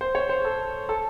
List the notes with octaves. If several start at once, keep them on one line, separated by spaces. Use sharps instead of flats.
C5
C#5
C5
A4
A4